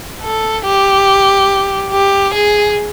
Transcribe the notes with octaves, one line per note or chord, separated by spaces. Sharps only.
A4
G4
G4
G#4